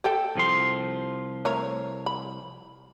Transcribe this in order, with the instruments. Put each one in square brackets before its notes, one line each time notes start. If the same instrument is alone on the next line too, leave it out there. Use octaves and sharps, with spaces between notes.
[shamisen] G4 A4 G5
[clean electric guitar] C2 F3 C6
[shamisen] A3 A#4 C#5
B5